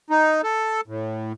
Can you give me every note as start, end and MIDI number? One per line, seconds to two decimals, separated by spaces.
0.10 0.41 63
0.44 0.81 69
0.87 1.33 45